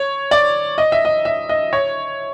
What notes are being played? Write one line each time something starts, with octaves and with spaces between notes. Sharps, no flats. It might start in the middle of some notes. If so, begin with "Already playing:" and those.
Already playing: C#5
D5
D#5
E5
D#5
E5
D#5
C#5